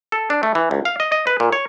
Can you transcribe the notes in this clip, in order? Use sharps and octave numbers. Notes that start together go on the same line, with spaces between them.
A4
D4
A3
E3
C#2
F5
D#5
D#5
B4
A#2
C#5